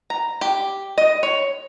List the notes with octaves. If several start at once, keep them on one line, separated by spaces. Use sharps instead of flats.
A#5
G4
D#5
C#5